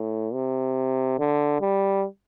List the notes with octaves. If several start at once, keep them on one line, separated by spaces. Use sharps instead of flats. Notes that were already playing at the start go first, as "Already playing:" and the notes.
Already playing: A2
C3
D3
G3